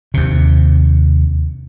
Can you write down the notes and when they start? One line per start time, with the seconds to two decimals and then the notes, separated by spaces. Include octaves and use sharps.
0.14 D#2 C3